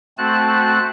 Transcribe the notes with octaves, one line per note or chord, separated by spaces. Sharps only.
A3 C4 F#4 A5 F#6